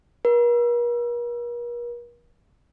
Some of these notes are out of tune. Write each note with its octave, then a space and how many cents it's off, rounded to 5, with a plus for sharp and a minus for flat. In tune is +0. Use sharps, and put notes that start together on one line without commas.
A#4 +45